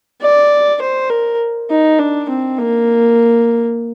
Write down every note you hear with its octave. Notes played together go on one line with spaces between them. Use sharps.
D5
C5
A#4
D#4
D4
C4
A#3